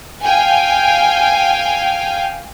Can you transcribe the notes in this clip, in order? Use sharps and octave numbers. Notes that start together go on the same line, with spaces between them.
F5 G5 G#5